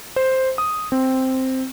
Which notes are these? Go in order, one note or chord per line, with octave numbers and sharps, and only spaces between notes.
C5
D#6
C4